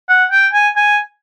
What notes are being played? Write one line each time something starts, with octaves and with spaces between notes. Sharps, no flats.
F#5
G5
G#5
G#5